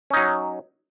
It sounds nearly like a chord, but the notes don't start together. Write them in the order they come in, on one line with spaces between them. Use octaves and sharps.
C#4 D#4 F#3